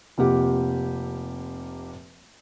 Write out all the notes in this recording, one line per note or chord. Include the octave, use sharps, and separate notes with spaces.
F1 C3 A#3 F4 G4 F#5